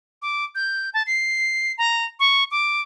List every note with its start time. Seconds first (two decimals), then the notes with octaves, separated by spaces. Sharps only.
0.22 D6
0.55 G6
0.94 A5
1.07 C7
1.78 A#5
2.20 C#6
2.51 D6